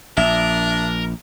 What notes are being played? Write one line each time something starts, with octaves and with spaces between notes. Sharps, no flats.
A#1 D4 A#4 E5